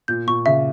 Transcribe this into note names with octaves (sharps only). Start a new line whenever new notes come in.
A#2 G6
A#2 C#6
C#3 E5